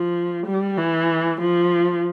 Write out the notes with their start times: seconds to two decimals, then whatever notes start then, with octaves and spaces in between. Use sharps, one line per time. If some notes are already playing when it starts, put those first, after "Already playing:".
Already playing: F3
0.46 G3
0.78 E3
1.41 F3